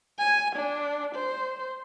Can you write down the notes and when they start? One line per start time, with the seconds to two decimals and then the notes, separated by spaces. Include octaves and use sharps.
0.19 G#5
0.56 D4
1.15 C5